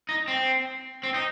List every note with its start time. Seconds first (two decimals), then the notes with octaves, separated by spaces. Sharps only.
0.09 D#4
0.28 C4
1.03 C4
1.14 D#4